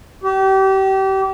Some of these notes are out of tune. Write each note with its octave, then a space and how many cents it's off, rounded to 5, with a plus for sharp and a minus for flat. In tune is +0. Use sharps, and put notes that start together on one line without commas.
G4 -30